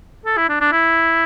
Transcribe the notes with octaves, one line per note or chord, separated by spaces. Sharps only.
A4
E4
D4
D4
E4